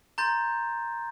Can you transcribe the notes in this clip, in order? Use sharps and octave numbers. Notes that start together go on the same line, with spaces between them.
A#5 C6 G6 A6